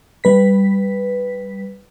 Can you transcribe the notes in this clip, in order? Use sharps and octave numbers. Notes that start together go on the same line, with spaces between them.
G3 B4 B6